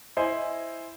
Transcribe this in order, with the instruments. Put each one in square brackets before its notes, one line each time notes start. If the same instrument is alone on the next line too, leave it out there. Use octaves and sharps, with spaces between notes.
[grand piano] E4 C5 D#5 G#5